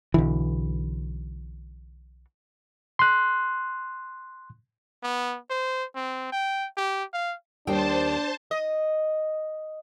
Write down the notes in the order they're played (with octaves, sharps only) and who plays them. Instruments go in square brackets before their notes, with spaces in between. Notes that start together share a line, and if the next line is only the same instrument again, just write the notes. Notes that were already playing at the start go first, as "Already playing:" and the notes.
[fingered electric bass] B1 D3 E3
[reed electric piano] C6 F#6
[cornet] B3
C5
C4
G5
G4
F5
[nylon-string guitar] D#2 G3 G5 [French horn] D4 [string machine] C5 A5
[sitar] D#5